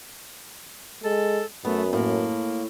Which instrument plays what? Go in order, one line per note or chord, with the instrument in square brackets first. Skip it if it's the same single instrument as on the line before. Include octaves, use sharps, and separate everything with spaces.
[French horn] G#3 [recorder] A4
[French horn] F#2 [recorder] A3 [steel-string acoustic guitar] B3
[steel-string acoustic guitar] A2 [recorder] A#3